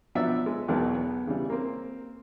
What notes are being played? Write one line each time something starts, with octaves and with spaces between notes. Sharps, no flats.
F3 F#3 B3 D4 D5 E5
G#3
B1 E2 B2 G#3 A#4 A5
B3
C#3 E3 G3
A#3 C4